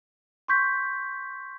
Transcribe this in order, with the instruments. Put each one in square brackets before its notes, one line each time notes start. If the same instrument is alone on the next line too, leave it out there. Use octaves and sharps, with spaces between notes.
[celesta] C6 C#6 G6 B6